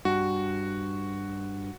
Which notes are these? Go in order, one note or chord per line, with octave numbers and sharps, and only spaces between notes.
G2 F#4